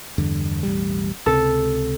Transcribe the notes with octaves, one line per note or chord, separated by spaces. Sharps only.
E2 G2 D3
E1 A1 G3
C#2 C3 A4